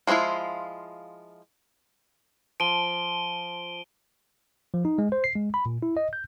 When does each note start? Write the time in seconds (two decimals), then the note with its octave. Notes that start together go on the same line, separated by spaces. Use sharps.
0.07 F3 G#3 B3 E4 F4
2.60 F3 D7 D#7 G7
4.74 F3
4.85 D#4
4.98 G#3
5.12 C5
5.24 C7
5.36 G#3
5.54 B5
5.66 A#2
5.83 E4
5.97 D#5
6.13 G6